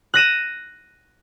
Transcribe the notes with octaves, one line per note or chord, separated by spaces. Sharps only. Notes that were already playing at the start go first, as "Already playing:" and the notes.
F#6 A#6 D#7 E7